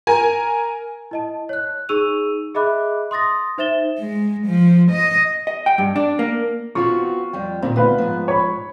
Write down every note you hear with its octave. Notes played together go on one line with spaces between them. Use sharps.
A#4 G#5
E4 D#5 A5
C#5 F#6
D#4 G#4 C#6 E6 D#7 F7
G#4 D#5 E5 B5 D6 F#6
C6 D#6 A6 A#6
D#4 C5 E5 A6 E7 G7
G#3
F3
D#5
D#5
G5
G2
D4
A#3
B3 C4 F4 F#4 C#6
F2 G3 G5
A#2 D#3 C4
D2 B3 F4 B4 F5
G#2 F3
C#5 B5